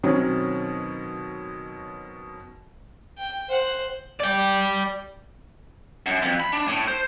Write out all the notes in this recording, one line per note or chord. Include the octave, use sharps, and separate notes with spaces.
B2 D#3 F#3 C4 C#4
G5
C5 F#5
D5 G5
F#2
F2
B5
D4
A2
C5